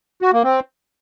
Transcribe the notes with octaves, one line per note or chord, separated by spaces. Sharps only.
F#4
A#3
C4